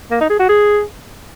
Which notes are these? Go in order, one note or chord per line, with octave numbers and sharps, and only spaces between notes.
A#3
D#4
G#4
F#4
G#4